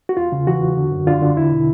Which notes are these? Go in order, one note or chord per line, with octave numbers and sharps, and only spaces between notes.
F#4
E2 F4
C#3
E3 F#4
E2
D3
F#2
D3 F4
D3
E2 E4
B2